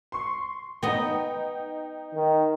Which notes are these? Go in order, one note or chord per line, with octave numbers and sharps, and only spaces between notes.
C6 C#6
B3 D#4 D#5 G5
D#3